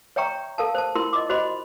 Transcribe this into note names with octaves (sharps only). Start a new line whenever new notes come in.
C#5 E5 G5 A#5 C#6
A4 A#4 F5 A5
C5 A5
E4 F4 A#4 C6
D#5 D6
F#4 C5 D#5 B5 C6